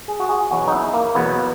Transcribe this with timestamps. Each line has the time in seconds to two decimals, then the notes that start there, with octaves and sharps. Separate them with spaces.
0.08 G#4
0.20 F#4
0.29 G#4
0.51 E2 B2 F#3 F#4
0.68 D#4
0.72 E4
0.94 A#3
1.15 E2 B2 F#3 B3